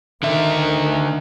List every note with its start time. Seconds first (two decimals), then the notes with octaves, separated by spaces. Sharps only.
0.23 D3 D#3 E5